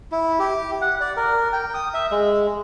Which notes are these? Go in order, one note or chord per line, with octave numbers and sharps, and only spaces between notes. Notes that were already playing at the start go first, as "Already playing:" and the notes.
E4
G4
F#5
D5
A#4
G5
D#6
E5
G#3